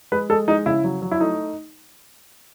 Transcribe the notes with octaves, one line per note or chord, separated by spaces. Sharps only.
G#3 B4
G#3 A4
G#3 D#4
C#3 E4
F#3
F#3
E4
A3 D#4